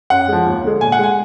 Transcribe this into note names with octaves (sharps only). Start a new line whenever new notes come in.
F#2 F#5
F3 G#3
D#2
D3 G#3
A#2 G#5
F#5
G#3 G#5